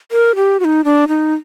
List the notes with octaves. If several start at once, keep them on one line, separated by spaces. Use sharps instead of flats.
A#4
G4
F#4
D#4
D4
D#4